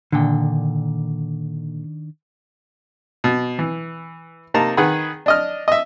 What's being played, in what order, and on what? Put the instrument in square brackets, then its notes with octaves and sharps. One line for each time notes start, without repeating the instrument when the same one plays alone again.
[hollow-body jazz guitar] A#2 D3 [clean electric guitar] D#3 D4 G5
[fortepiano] B2
E3
C3 A#3 D#4 A5 A#5
D#3 G#4 B4 F#5 B5
D4 D#5 F6
D#5 E5